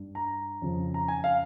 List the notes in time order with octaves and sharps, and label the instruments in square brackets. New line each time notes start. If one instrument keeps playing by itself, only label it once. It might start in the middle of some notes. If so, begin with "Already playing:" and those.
Already playing: [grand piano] G2 G3
A#5
F2 C#3 F3
A#5
G#5
F5